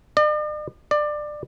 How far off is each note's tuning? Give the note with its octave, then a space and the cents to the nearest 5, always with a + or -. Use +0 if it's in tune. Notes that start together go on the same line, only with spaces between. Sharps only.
D5 +45
D5 +20